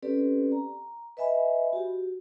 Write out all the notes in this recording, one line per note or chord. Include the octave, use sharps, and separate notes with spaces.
C4 C#4 G4 A4 B4 D5
A#5
B4 D#5 E5 G#5 B5
F#4 G4